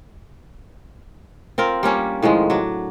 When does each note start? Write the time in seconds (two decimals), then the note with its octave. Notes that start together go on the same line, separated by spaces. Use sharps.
1.58 C4 F4 A#4
1.83 G3 A#3 C#4 D4
2.22 A2 D#3 F3 G#3
2.50 F#3 D4